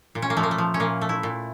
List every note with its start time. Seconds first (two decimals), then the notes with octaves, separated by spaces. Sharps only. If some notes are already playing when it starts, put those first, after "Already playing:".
0.15 A#2
0.22 C#4
0.30 A#3
0.37 F3 A3
0.43 A#3
0.51 A3
0.58 F3
0.74 C#4
0.80 A#2 A#3
1.01 A3
1.09 E4
1.23 A#2